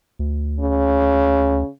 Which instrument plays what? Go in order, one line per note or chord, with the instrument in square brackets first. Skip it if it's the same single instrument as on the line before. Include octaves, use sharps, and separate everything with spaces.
[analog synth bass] D2
[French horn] C#3